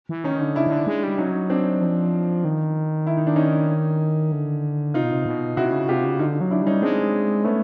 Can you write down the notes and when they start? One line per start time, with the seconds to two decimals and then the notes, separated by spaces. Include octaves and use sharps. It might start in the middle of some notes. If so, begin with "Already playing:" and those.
0.09 E3
0.24 D#3 C#4 D#4
0.41 D3
0.55 C#3 D4 E4
0.67 D#3
0.72 D3
0.87 G#3
1.03 G3
1.18 F#3 C#4 D#4
1.50 C4 D4
1.81 F3
2.45 D#3
3.07 E4
3.17 D#4
3.27 D4
3.36 C#4 D#4
4.32 D3
4.94 C3 D#4 F4
5.04 B2
5.12 C3
5.26 B2
5.57 C3 E4 F#4
5.72 C#3
5.88 C3 F4 G4
6.05 C#3
6.19 D3 D#4 F4
6.41 F#3
6.51 D4 E4
6.62 G3 C#4 D#4
6.82 G#3 C4 D4
7.44 A3 B3 C#4